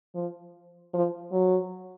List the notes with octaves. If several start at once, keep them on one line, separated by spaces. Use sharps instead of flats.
F3
F3
F#3